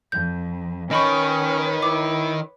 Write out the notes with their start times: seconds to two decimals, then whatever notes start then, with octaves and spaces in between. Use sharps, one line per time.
0.12 F2 G6
0.91 D#3 C#4 B4 C#5 D#5 B5 C#6
1.82 E4 D6